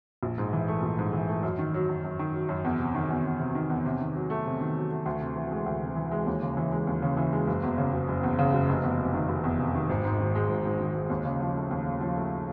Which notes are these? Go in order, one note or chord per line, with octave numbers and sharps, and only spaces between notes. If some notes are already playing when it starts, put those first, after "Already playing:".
A#1
G#2
E3
A3
A#1
G#2
E3
A3
F#2
D#3
F#3
F#2
F#2
D#3
F#3
F#2
E2
C3
D#3
E2
E2
C3
D#3
E2
C3
D#3
F#3
A3
C3
D#3
F#3
A3
D2
C3
E3
G#3
D2
C3
E3
G#3
D#2
C#3
E3
G#3
D#2
C#3
E3
G#3
F#1
E2
C#3
F#1
F#1
E2
C#3
F#1
F1
E2
C3
D#3
F1
E2
C3
D#3
G#1
G#2
D#3
G#3
G#1
G#2
D#3
G#3
D#2
C#3
F3
A3
D#2
C#3
F3
A3